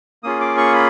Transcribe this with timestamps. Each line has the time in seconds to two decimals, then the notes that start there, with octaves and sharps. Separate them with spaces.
0.23 A#3 C#4 F4 G#4 D#6
0.41 D6
0.57 C#6
0.75 B5